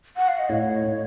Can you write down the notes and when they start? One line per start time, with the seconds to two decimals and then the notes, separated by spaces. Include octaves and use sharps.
0.17 F#5
0.28 F5
0.39 D#5
0.49 A2 C#5
0.84 A2